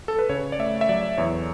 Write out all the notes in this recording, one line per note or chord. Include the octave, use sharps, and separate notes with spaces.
A4
B4
C#3 C#5
D5
A3 E5
E5
F#3 D5
E2 C#5